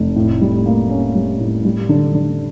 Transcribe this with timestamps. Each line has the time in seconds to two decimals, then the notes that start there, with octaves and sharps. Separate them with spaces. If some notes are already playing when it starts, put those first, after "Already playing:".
Already playing: F1
0.16 A2
0.41 G3
0.66 A#3
0.90 C#4
1.15 G3
1.40 A2
1.65 G3
1.89 D3
2.15 D3